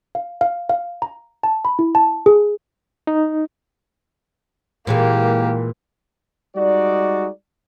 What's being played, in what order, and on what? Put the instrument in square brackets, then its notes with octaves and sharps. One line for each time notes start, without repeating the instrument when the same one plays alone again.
[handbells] F5
F5
F5
A#5
A5
B5
E4
A5
G#4
[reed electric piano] D#4
[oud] A#2 E3 G#3 [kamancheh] A#3 G4
[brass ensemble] G3 G#3 D#4 F#4 D5